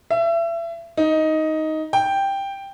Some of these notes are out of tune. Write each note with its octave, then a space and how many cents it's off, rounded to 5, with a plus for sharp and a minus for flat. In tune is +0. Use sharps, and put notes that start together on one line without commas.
E5 +30
D#4 +10
G5 +5